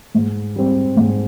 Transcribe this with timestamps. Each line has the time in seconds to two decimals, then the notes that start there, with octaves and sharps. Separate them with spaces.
0.15 G#2
0.56 G3 C4
0.97 G#2